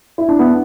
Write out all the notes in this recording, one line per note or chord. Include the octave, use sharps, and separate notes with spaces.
E4
D4
B3